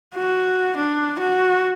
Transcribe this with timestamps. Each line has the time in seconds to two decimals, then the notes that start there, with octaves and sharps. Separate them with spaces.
0.15 F#4
0.77 D4
1.19 F#4